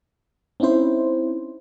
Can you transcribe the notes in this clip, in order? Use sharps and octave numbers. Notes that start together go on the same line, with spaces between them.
C4 C#4 D#4 E4 C5